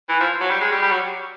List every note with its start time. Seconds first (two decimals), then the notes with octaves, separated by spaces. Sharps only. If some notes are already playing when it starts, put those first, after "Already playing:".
0.09 E3
0.20 F3
0.41 F#3
0.50 G3
0.61 G#3
0.72 G3
0.82 G3
0.91 F#3